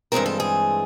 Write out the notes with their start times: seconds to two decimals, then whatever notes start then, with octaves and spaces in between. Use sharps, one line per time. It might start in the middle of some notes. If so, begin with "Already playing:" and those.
0.12 G2 E3 G#3 C4 F4 A#4
0.26 A4
0.40 G#4